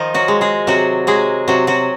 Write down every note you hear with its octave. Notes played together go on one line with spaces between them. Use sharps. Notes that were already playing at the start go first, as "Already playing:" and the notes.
Already playing: D#3 F3 D#4
F#3 F#4
G#3
G#3 G#4
C3 F#3 F#4
F#3 G#3 G#4
C3 F#3 F#4
F#3 F#4